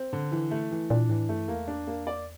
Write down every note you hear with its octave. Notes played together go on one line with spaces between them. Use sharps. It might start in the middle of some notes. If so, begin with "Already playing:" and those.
Already playing: C4
D3
E3
A3
E3
A#2 D4
A2 E3
G2 A3
E2 A#3
D4
A#3
D5